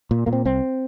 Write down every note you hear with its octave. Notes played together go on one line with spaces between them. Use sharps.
A#2
A#2 A#3
C4
C2 C4